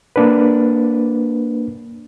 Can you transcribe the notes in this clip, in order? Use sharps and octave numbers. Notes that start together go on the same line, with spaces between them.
A#3 D4 B4